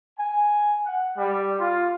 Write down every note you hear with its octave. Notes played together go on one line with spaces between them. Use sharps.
G#5
F#5
G3
F4